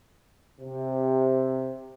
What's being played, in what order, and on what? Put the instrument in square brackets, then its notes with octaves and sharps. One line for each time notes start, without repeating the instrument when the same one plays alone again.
[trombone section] C3